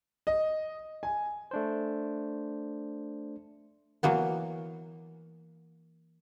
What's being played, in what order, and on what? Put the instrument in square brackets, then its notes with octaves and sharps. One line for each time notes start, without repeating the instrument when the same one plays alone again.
[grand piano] D#5
G#5
[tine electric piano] A3 D4 C5
[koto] E3 F#3 A#3 B3